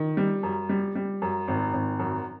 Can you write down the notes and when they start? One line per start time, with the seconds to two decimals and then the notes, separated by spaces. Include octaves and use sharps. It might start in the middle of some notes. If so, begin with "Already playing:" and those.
Already playing: D#3
0.17 G3
0.43 F#2
0.69 G3
0.95 G3
1.22 F#2
1.48 G#1
1.74 G#1
1.99 F#2